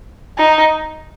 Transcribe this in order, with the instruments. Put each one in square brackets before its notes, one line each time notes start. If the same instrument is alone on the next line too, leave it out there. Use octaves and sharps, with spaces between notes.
[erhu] D#4